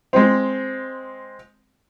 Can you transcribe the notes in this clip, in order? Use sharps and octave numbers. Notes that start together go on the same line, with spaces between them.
G#3 C4